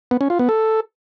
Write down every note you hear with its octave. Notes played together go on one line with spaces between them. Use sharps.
B3
C#4
F4
B3
A4